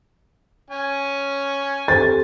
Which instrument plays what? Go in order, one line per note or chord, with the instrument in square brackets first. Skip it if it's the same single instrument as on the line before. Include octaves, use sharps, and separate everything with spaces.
[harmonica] C#4 G#5
[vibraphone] C4 G4 A4 [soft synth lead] C5 [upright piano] A6